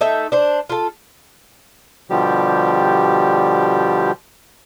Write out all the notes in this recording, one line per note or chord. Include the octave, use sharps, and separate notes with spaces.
A3 D#4 E5
D4 C5
F4 A4
B2 D3 F3 G3 G4